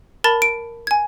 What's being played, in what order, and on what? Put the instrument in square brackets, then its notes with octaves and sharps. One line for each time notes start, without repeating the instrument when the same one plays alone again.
[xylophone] A#4 A5 B5 A6
D7
G#5 G#6